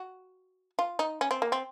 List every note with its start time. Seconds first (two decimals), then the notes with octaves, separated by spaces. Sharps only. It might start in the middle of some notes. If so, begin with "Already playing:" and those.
Already playing: F#4
0.79 F4
0.99 D#4
1.21 C#4
1.31 C4
1.42 A#3
1.52 C4